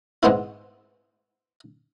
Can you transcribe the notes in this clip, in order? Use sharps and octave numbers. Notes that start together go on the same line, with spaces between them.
G#2 G#3 B3 C4 E4